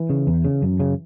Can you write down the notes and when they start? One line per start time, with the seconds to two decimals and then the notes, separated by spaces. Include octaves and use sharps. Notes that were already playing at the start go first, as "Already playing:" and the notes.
Already playing: E3
0.10 C#3
0.27 E2
0.45 C#3
0.62 F#2
0.80 C#3